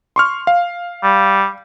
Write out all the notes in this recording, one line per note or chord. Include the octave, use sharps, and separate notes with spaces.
C6 C#6 F6
F5
G3